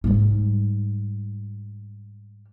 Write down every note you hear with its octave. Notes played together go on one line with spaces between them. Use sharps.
G#2 G3